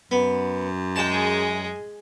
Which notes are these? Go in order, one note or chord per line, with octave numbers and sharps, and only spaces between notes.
F#2 B3
G#3 G#4 G5 A5